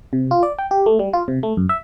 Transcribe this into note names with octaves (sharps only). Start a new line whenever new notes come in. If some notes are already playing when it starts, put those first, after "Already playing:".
C3
F4
D5
G5
G4
A3
G3
F4
C3
A3
F#2
E5